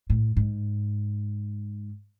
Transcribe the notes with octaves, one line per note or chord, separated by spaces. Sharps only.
A2
G#2